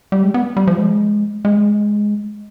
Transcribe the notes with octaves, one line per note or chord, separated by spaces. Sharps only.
G3
G#3
B3
G3
F3
G#3
G#3